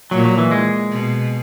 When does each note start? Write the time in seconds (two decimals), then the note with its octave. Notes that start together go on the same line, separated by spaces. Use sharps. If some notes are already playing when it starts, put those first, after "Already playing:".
0.11 A#2 F#3
0.25 F#3
0.38 E3
0.52 G#3
0.92 B2